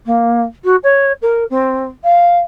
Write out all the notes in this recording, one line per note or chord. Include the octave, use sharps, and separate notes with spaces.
A#3
F#4
C#5
A#4
C4
F5